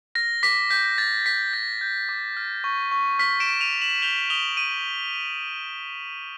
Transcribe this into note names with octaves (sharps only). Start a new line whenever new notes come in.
F6 A#6
D6 B6
G6 B6
D6 A6
D6 B6
G6 A#6
G6
D6
F6
C#6
C#6
F6 B6
D7 E7
F6
D#7 F7
C#6
E7 F#7
G6 F7 G7
D#6 F7 G7
D#7